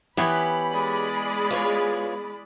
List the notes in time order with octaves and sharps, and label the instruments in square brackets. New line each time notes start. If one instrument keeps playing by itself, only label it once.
[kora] E3 B3 E4 [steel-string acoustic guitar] G4 C#5 [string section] B5
[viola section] G#3 G#4 D5
[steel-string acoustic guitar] F4 B4 C#5